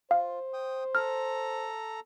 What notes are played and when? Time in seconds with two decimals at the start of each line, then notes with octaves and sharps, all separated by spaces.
0.11 F4 C5 F5
0.53 G5 D#6
0.95 A4 A#5 F6